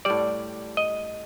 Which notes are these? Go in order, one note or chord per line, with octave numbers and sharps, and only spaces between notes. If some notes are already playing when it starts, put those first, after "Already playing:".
A2 G3 D5
D#5